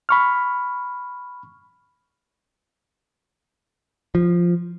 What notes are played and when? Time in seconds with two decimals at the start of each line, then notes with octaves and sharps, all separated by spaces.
0.09 B5 C#6 F6
4.15 F3